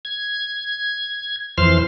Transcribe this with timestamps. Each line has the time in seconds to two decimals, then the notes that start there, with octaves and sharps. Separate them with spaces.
0.05 G#6
1.58 F2 E3 C5 C6 F6